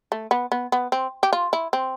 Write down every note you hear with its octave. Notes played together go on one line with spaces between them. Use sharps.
A3
B3
B3
B3
C4
G4
F4
E4
C4